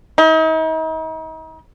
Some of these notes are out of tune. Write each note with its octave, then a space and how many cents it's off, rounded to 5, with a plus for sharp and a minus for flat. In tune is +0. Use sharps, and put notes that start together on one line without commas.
D#4 +40